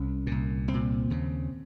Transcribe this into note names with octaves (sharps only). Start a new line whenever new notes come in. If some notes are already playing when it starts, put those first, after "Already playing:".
Already playing: C2 C#4
C2 A#2
C2 C4
A#2
D#2 C#3